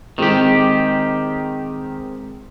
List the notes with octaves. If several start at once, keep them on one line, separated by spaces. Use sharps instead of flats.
D#3 G#3 C4 G4